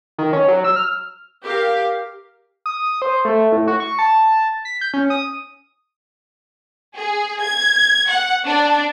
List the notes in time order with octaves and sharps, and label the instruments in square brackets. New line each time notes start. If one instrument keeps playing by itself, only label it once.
[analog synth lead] D#3
C#4
F#3
E6
F6
[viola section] G4 A#4 F5
[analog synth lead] D#6
C5
A3
A2
F#4
C#6
A5
B6
G6
C#4
D#6
[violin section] G#4
G#6
F#5
D4